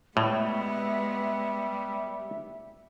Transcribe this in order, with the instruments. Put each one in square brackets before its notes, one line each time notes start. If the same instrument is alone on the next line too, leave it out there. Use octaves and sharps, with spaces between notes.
[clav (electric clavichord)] A2 [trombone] G3 [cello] G#3 B3 [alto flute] E5